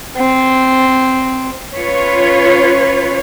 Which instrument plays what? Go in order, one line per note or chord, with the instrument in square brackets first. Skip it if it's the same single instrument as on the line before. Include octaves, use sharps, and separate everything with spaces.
[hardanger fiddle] C4
[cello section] C#4 F4 B4 C#5